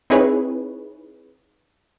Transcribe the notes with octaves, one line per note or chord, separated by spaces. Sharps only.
C4 D#4 E4 G#4 B4 C#5